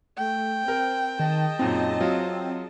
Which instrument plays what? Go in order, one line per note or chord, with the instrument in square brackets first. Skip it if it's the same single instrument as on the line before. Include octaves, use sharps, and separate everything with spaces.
[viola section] A3 [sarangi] G5
[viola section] C4 [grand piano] A#4
[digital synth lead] D#3 [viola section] G#4 D#5 A5
[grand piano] F#2 A#2 D#4 [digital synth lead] C4
[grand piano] F#3 F4